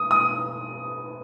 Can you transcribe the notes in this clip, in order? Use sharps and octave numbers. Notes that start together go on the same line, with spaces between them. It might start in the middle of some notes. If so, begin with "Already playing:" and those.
Already playing: D#6
D#6